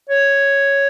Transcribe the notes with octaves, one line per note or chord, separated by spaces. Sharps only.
C#5